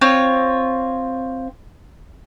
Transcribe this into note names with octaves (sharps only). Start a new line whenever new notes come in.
C4 F4 C#5